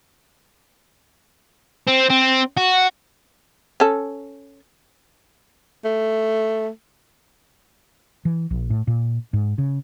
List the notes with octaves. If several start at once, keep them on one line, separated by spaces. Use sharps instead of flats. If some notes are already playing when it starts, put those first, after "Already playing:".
C4
C4
F#4
C#4 A4
A3
E3
A#1
A2
A#2
G#2
C#3